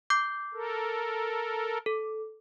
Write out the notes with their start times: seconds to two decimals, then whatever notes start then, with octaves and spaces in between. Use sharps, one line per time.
0.10 D6 G6 C7
0.54 A4 A#4
1.86 A4